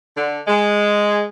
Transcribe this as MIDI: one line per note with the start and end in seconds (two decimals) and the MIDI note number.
0.16 0.41 50
0.46 1.24 56